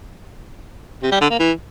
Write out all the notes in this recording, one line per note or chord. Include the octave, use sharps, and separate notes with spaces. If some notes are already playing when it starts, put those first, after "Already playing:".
C3
G3
D3
A#3
E3